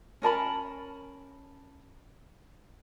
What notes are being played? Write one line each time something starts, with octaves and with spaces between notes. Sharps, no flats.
C#4 A#4 A5 B5